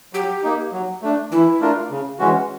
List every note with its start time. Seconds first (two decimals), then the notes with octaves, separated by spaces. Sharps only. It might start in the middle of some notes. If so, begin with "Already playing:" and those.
0.13 F#3 G4
0.43 A#3 D#4
0.72 F#3
1.02 A3 D4
1.31 E3 E4
1.60 A3 D4 F4 A#4
1.90 C#3
2.19 E3 G#3 C#4 F#4